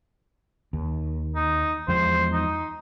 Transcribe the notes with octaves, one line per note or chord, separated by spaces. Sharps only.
D#2
D#4
E2 F3 G#3 C5
D#4